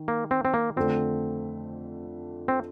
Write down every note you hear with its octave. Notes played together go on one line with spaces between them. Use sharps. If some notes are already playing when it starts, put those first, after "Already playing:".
Already playing: D#3
A#3
C4
C4
A#3
F2 D3 A3 C4
C4